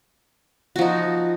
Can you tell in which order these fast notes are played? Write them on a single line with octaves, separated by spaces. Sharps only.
F#4 F3 D#4